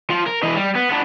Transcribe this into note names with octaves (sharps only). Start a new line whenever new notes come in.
F3
A#4
E3 D#5
G3
B3
B3 D4